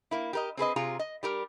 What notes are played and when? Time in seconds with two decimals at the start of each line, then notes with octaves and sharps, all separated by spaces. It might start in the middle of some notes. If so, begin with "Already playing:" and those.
0.11 A#3 E4
0.33 G4 A#4 D#5
0.57 C4 G#4 B4 D#5
0.76 C3 F4 G#4 A#5
0.99 D#5
1.23 G3 G4 A#4